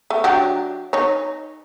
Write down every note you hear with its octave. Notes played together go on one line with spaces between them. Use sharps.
A3
F#3 D4 G4
D#4 C#5